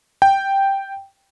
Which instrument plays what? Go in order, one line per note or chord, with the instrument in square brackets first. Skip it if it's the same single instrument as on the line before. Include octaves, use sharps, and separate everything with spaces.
[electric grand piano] G5